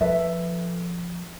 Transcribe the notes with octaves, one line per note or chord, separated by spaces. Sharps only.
F3 A4 B4 E5